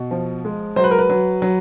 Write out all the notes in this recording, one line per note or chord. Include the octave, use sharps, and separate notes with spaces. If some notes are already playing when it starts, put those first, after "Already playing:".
Already playing: B2
F3
G#3
F#3 C5
B4
A#4
B4
F#3
F#3